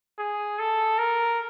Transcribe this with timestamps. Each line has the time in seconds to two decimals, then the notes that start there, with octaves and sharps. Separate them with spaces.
0.19 G#4
0.59 A4
0.99 A#4